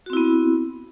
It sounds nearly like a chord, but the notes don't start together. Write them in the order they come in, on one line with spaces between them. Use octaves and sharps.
F#4 C4 E4 B3